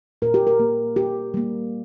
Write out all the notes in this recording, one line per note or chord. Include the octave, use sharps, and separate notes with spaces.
A#2 A#4
G4
A#4
A#3
A#2 G4
G3 A#3